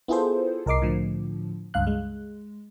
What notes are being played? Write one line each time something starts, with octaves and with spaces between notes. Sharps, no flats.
B3 E4 F4 G#4 A4 C5
C2 A#4 D#5 D6 C7
A2 D3 F3
C#2 G2 F5 F#6
G#3